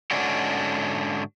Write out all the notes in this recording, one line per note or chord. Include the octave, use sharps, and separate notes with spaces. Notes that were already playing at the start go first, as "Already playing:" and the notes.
G#2 D3 C#4 D4 F#4